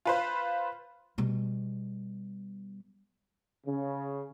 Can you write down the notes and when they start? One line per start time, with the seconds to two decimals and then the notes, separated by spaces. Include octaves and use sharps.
0.05 F4 B4 C5
1.18 B2 G3
3.67 C#3